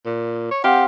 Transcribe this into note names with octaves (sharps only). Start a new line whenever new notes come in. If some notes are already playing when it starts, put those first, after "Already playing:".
A#2
C#5
C4 G4 F5 F#5